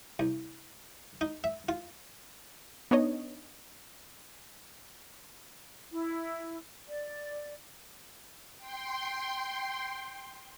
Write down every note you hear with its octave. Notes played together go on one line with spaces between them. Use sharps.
C2
D#4
E5
F4
B3 D4 D#4 C#5 D#5
E4
D5
G5 C6